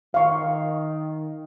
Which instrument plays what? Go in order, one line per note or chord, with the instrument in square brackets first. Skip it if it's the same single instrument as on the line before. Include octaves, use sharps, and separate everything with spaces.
[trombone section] D#3 [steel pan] F5 C#6